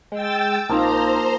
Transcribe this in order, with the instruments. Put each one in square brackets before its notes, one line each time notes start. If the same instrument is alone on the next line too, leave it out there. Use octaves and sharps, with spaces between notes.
[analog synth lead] G#3 [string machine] G5 E6 A6
[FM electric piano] A#1 D#4 [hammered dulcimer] F3 C4 [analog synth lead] A#3 [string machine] C5 A#5